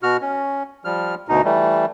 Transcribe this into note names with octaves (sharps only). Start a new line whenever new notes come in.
B2 F#4 F6
C#4
F3 G3 F6
D2 B2 D#4
E3 G3 A3